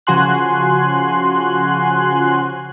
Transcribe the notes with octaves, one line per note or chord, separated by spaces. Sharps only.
C#3 F3 F#4 G#5 C6 F#6